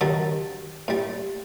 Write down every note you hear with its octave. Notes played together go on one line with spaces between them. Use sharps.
D3 D#3 F#3 G3 A4
A2 G3